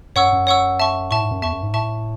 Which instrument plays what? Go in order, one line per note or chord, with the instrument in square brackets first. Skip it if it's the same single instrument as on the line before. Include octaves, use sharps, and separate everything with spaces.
[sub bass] F#2 [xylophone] C#5 F#5 C#6 E6
[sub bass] F#2
[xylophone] C#5 F#5 C#6 E6
E5 A5 C#6
[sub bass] A2 [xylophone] E5 A5 C#6
[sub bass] G#2
F#2
[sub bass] E2 [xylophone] E5 A5 C#6
[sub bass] F#2
G#2
[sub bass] A2 [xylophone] E5 A5 C#6